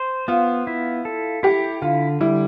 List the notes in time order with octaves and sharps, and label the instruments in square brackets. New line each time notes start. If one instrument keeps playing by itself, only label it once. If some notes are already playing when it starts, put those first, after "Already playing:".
Already playing: [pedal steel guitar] C5
[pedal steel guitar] B3 [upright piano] F4
[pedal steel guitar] E4
A4
[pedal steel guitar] E4 [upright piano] G4
[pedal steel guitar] D3 [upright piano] F4
[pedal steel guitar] G3 [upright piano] E4